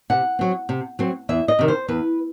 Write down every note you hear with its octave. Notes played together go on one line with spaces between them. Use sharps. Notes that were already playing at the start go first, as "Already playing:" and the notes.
C3 F#5
F#3 C4
C3
F#3 C4
E2 E5
D#5
C3 D#3
C5
E2 B4